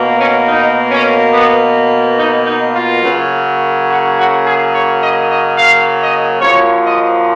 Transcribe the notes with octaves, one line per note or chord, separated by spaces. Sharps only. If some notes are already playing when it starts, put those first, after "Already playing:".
Already playing: B2 A#3
C#4
D#4
C#4
B3
D#4
D#4
F4
C#3 F#3 A#3
F#4
F#4
G#4
C#5
D#5
D#5
F5
D#5
F#2 F3 A#3 C#5
D#5